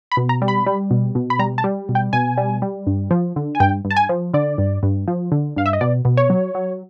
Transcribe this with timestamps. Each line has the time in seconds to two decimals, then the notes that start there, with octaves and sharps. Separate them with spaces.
0.12 B5
0.17 B2
0.29 A#5
0.42 G3
0.48 B5
0.66 G3
0.91 B2
1.15 B2
1.30 B5
1.39 G3 A#5
1.58 A5
1.64 G3
1.89 B2
1.95 G5
2.13 B2 G#5
2.38 G3
2.62 G3
2.87 G2
3.11 F3
3.36 D3
3.55 G#5
3.60 G2 G5
3.85 G2
3.91 A5
3.96 G#5
4.09 F3
4.34 D3 D5
4.58 G2
4.83 G2
5.08 F3
5.32 D3
5.56 G2 F5
5.66 E5
5.73 D#5
5.81 B2 D5
6.05 B2
6.17 C#5
6.30 F#3
6.55 F#3